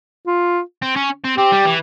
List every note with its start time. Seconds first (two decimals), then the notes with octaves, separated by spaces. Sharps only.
0.27 F4
0.82 C4
0.96 C#4
1.24 C4
1.38 C4 G4
1.52 G3
1.66 E3